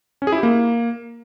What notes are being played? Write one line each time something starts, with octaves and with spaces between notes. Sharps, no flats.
C#4
G#4
E4
G4
A#3